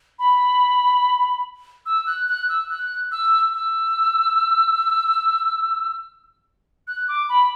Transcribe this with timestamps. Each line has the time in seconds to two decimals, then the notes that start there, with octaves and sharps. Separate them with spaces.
0.19 B5
1.86 E6
2.07 F#6
2.28 F#6
2.49 E6
2.69 F#6
3.12 E6
3.53 E6
6.87 F#6
7.08 D6
7.29 B5